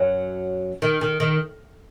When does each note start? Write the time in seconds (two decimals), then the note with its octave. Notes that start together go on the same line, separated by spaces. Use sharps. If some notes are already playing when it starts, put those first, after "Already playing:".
Already playing: F#2 F#3
0.82 D#3
1.01 D#3
1.20 D#3